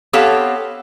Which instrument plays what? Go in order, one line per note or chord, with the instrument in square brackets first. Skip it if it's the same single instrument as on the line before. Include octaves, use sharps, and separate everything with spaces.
[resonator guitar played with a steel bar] B3 C4 G4 A4 C#5 F5